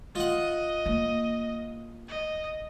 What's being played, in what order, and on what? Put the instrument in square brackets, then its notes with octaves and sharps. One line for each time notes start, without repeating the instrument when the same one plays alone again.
[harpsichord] F4 F#5 [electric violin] D#5
[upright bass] A#3
[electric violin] D#5